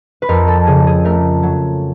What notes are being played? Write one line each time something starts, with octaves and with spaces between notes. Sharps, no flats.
B4
F2 A#4
A4
C#3 G#4
G#4
A3 A#4
F#3